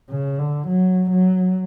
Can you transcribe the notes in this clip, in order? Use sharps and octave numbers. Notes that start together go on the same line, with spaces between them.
C#3
D3
F#3
F#3